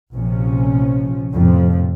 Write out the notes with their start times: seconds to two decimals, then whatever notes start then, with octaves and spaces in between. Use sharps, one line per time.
0.14 A#1 C3 F3 C#4
1.32 A#1 F2 A2 C3 F3